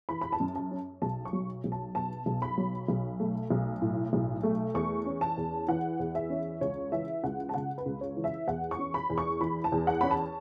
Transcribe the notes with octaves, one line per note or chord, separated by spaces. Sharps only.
E3 B5
B5
A5
F#2
A5
C#4
B1 A5
C#6
F#3
B1
A5
B2 A5
B1
B5
F#3
B1
A3
B1
A2
B1
A3
E2 C#6
C#4
A5
E2
E3 F#5
E2
E5
C#4
C#2 C#5
E3 E5
C#2 F#5
A5
C#3 F#5
B4
C#2
C#5
E3
E5
E2 F#5
C#6
C#4
B5
E2
C#6
E3 B5
A5
E2
F#5
C#4 B5
A5